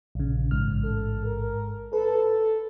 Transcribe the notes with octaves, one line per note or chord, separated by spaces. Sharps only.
A#1 C#3
A1 G#2 F6
A4
A#4
A4 B4